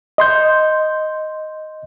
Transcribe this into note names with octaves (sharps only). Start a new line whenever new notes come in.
D#5 C6 G6